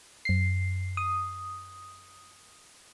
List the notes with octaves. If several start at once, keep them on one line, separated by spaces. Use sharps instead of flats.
F#2 C7
D#6